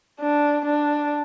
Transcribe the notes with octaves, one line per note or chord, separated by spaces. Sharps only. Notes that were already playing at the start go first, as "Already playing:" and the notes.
D4
D4